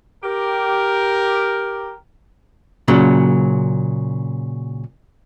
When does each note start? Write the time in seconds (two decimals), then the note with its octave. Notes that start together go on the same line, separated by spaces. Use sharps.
0.23 G4 A#4
2.88 A#2 C#3 F#3